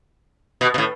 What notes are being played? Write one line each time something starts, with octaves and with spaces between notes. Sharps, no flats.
B2
B2
A2